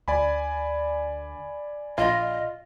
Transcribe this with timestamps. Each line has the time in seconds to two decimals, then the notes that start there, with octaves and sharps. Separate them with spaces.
0.08 D2 D5 G#5 B5
1.98 A#1 F4 D#5